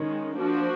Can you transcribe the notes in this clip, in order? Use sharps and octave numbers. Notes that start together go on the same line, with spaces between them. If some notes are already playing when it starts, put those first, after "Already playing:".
Already playing: D#3 G#3 C#4
F3 A#3 D4 F#4